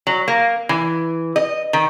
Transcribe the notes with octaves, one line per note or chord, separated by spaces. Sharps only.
F#3
A#3
E3
D#5
D#3